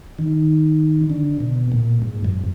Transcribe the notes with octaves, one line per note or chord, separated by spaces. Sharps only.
D#3
D3
B2
A#2
G#2
F#2